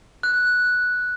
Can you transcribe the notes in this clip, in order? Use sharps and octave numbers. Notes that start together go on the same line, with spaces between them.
F#6